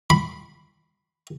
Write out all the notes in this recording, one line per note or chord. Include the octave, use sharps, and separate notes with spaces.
B5